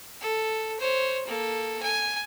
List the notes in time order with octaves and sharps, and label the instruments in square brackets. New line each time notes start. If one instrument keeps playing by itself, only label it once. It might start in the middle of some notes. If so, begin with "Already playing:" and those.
[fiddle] A4
C5 C#5
A#3 A4
G#5